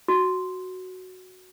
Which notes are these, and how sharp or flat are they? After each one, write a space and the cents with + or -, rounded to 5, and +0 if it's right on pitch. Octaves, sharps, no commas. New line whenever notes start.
F#4 +0